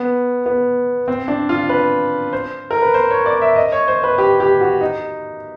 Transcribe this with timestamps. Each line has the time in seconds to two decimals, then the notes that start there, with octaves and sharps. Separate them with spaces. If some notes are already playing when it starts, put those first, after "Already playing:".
Already playing: B3
0.46 B3
1.08 C4
1.28 D4
1.49 F4
1.69 B4
2.33 C5
2.71 A#4
2.82 B4
2.94 C5
3.11 C#5
3.26 D5
3.42 E5
3.56 D#5
3.72 C#5
3.88 C5
4.04 B4
4.18 G4
4.40 G4
4.61 F#4
4.81 D#4